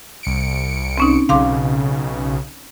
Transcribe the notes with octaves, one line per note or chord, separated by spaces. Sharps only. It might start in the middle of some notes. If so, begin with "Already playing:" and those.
C2 C#7 D7
C4 C#4 D#4
B1 C#3 F5 C6 D6